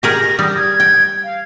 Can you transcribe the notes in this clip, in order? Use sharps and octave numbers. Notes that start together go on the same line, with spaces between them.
G4 G#4 A#4 A#6
G3 D#6
G#6
G5
F5